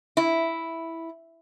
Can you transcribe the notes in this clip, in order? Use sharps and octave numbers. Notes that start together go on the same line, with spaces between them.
E4